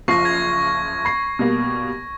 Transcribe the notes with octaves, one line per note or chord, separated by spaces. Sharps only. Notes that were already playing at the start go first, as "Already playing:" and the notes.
F#1 F3 C#6 A#6 C7
G#6 A#6
B5 C7
B2 G3 A#3